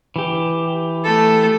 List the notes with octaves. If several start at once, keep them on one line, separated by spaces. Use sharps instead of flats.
E3 G4
A3 A4